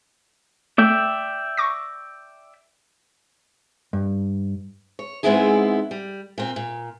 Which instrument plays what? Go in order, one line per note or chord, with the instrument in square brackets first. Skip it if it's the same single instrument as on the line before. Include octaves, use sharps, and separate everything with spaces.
[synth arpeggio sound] A3 [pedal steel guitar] D5 E5 G5
[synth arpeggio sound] C#6 D6 A#6
[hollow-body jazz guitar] G2
[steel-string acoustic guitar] C#5
G#2 G#3 B3 C4 E4 G#4
G3
A#2 C4
A#2